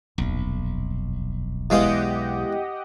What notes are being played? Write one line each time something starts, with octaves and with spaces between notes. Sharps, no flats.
D#1 B1 F2
E2 G#3 G4 D#5 F5 F#5